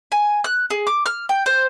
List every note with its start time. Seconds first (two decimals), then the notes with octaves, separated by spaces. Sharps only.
0.12 G#5
0.44 F#6
0.70 G#4
0.87 D6
1.06 F6
1.29 G5
1.46 C5